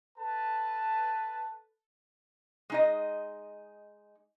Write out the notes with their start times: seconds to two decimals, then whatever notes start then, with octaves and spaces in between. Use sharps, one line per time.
0.19 A4 B4 A5
2.70 G#3 D#4 D#5